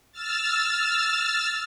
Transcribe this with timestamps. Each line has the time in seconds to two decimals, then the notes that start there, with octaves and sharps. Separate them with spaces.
0.12 E6 F6 A6